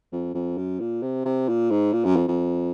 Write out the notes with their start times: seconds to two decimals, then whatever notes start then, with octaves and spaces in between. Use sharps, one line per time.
0.12 F2
0.34 F2
0.57 F#2
0.80 A#2
1.02 C3
1.26 C3
1.49 A#2
1.71 G#2
1.93 A#2
2.05 F#2
2.16 F2
2.28 F2